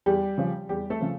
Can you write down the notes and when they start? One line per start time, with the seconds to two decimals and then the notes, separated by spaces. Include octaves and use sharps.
0.06 E2 G3 G4
0.38 C#3 F3
0.69 E2 G3 G4
0.90 A3 A4
1.01 C#3 F3